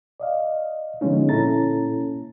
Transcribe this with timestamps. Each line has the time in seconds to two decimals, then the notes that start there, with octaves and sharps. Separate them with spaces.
0.20 D5 D#5 F5
1.01 D3 F3 G#3 B3 C#4 D#4
1.29 A#2 C#4 E4 A4 A#5 A6